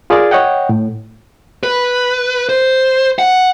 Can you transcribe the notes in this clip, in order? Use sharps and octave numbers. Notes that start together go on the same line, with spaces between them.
F4 G#4 A#4 D5 A6
C#5 D#5 F#5 G5
A2
B4
C5
F#5